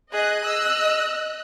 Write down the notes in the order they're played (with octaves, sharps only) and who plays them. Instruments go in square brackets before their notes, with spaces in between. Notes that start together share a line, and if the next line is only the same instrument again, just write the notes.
[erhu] G#4 [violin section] D#5 F#6
[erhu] E6